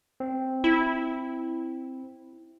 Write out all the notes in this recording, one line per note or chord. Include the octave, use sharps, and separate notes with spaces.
C4
E4